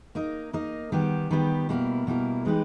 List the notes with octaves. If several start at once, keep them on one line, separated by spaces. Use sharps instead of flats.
A#3 D#4 A#4 D#5
A#3 D#4 A#4 D#5
D#3 G3 B3 G4
D#3 G3 B3 G4
B2 G3 A#3 E4 A#4
B2 G3 A#3 E4 A#4
E3 G#3 D#4 G4 B4